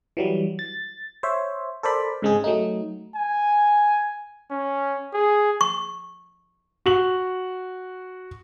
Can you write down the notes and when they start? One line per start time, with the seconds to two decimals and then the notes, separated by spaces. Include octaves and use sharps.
0.17 E3 F#3 G3
0.59 A6
1.23 C5 C#5 E5
1.83 A4 A#4 C5 D5 B5
2.22 G#2 C#3 G#3 C4 G#4
2.44 F#3 A3 D#4
3.16 G#5
4.51 C#4
5.13 G#4
5.61 C#6
6.86 F#4 F#7